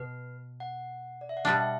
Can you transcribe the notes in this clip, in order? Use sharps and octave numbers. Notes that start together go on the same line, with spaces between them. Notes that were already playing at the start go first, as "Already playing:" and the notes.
Already playing: B2 B4
F#5
D5
E5
F#5
B2 G3 D4 G5
E5